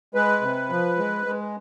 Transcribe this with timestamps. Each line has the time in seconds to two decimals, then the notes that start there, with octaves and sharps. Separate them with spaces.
0.15 G#3 B4
0.41 C3
0.70 F3
0.98 G#3
1.26 G#3